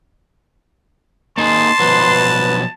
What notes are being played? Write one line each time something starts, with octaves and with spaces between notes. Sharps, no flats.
A#3 D#4 G#4 A5 C6
B2 F3 F#3 B4